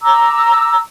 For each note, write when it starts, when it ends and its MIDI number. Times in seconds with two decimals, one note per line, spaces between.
0.01 0.78 82
0.01 0.78 86
0.01 0.78 88